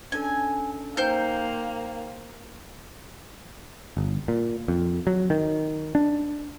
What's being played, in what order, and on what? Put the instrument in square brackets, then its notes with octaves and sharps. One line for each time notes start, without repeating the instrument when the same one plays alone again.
[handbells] C#4 D4 A4 [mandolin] G#5
[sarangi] A#3 [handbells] D#4 G5 C#7 [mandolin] C5 G6
[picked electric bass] G1
A#2
F2
F#3
D#3
D4